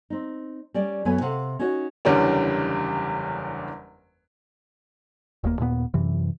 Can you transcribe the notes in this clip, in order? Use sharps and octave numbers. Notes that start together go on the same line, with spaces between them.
C4 D#4
G3 C#4 D5
F#2 A3 B3 B4 C#5 G#5
C3 F5 F#5
C#4 D#4 F#4 C#5
F#1 E2 D3 G3 C#4
E1 D#2 D#3 A#3
D#2 A#2 G#3 B3
F#2 C3 E3